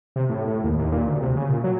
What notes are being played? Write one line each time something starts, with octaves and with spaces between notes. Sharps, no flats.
C3
A2
A2
D#2
D#2
A#2
D2
C3
C#3
A#2
F#3